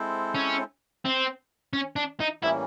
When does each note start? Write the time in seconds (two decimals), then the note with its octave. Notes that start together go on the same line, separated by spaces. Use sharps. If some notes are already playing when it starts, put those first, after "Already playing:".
Already playing: G#3 C4 E4 A4 C5
0.35 C#4
1.05 C4
1.73 C#4
1.96 D4
2.20 D#4
2.43 A2 E3 G3 A#3 C#4 E4